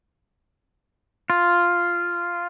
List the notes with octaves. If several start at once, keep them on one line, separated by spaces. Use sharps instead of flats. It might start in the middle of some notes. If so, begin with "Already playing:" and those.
F4